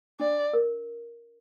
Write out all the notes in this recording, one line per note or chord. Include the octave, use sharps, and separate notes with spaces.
D4 D5
A#4